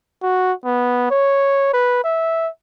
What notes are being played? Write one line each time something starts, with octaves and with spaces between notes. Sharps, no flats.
F#4
B3
C#5
B4
E5